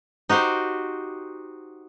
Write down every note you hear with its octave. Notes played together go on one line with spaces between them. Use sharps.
D#4 F#4 G4 C5